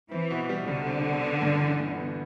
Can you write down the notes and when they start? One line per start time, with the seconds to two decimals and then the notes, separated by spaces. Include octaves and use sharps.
0.11 E3 C4
0.30 B2
0.49 G3
0.67 C2 D3
0.86 C4
1.05 B2
1.24 B3
1.42 G2
1.60 E3
1.79 G1
1.97 B3